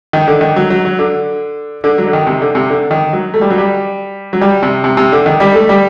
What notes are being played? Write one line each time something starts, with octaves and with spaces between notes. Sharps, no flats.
D#3
D3
D#3
F#3
F#3
F#3
D3
D3
F#3
D3
D#3
C3
D3
C3
D3
D#3
F#3
A3
G3
F#3
G3
F#3
G3
C3
C3
C3
D3
D#3
G3
A3
G3